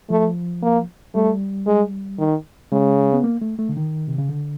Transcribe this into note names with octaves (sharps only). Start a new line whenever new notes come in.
F3 A3
A#3
G3 A3
G#3
D#3
C#3 G#3
B3
A#3
A3
A3
D3
D#3
C3
C#3
D3